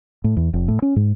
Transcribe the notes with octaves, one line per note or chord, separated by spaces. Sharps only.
A2
E2
F1
A2
C#4
G#2